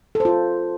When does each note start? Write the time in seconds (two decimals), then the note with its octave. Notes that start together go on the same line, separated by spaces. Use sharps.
0.15 A4
0.20 C5
0.25 F4